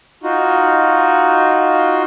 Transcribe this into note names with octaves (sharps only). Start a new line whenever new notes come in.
D#4 F4 F#4